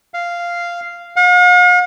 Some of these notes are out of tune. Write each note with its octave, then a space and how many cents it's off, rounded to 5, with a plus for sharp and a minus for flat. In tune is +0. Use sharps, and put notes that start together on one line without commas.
F5 -10
F5 +45